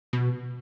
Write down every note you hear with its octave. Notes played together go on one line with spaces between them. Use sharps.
B2